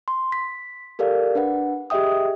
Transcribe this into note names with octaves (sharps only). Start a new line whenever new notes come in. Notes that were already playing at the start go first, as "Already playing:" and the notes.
C6
B6
G4 A4 A#4 D5 F5
D4 B4 F#5
G4 G#4 D#5 E5 G5 D#6